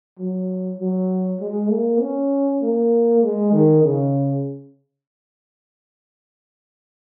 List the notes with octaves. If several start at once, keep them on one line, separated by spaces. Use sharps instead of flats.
F#3
F#3
G#3
A#3
C#4
A#3
G#3
D#3
C#3